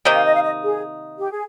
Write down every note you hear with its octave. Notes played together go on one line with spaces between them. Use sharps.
C3 D#3 A#3 D#4
F5
D#5
F5
D#5
G#4
G4
G#4